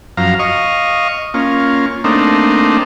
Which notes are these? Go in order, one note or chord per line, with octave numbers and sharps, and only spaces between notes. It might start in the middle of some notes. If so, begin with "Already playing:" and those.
F#2 F3 F5 A#5
D#5 F5 C#6
A#3 C#4 F4
A3 A#3 C4 D4 D#4